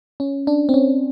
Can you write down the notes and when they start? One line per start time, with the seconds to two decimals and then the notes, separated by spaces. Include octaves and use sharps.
0.20 C#4
0.47 D4
0.69 C4
0.74 C#4